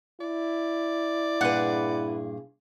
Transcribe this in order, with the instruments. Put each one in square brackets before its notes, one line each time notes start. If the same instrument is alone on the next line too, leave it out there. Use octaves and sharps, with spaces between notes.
[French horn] E4 [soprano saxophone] D5
[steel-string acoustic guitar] G2 A#2 G#4 [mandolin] B4 F#5